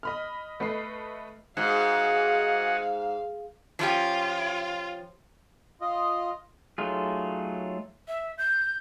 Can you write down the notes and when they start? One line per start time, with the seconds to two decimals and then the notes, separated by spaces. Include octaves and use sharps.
0.03 D#5 B5 F6
0.60 A3 B4 D#5 C7
1.57 G#2 F#4 G#4 F5 F#5
3.79 F3 C#4 F4 G4
5.81 F4 D#5
6.78 F#3 A3 D#4 F4 G#4
8.08 E5
8.38 G6